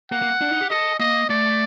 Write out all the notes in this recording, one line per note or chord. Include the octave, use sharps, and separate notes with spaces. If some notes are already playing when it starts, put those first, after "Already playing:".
A#3 F#5
A#3
D4
D#4
G4
A4 D#5
A#3 D#5
A3 D5